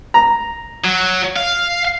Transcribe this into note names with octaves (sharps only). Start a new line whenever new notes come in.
A#5
F#3
F5